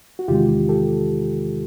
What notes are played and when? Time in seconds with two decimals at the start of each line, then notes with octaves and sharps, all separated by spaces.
0.19 F#4
0.28 E2 C3 D#3 G#3 F4 G4
0.69 G4 A4